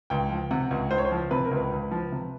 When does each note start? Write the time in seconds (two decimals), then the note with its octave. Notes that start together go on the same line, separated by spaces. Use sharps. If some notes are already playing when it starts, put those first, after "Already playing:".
0.10 C#2 G5
0.31 F3
0.51 C3 F#5
0.71 C#2
0.91 C#2 C5
0.98 C#5
1.05 C5
1.11 F3
1.31 C3 B4
1.45 A#4
1.51 C#2
1.57 B4
1.72 C#2
1.91 F3
2.12 C3